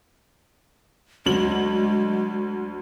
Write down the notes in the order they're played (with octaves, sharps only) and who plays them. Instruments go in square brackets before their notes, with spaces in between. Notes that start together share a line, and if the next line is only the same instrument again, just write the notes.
[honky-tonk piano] D2 F#3 F#7 [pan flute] G#3